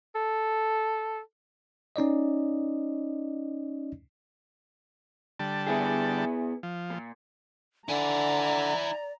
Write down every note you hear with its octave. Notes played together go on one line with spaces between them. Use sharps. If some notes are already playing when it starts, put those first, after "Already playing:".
A4
C#4 D#4 D5 D#5
D3 G3 A5
B3 E4 G#4
F3
A#2
D3 E4 D5 G#5 A#5